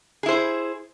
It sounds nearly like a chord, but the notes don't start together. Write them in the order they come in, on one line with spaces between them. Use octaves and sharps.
G#4 E4 C5